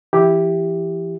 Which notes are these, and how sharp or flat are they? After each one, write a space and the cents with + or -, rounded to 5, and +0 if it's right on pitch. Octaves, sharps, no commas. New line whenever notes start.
E3 +35 E4 +0 G4 +0